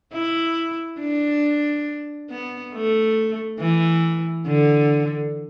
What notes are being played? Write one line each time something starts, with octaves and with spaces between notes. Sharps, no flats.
E4
D4
B3
A3
E3
D3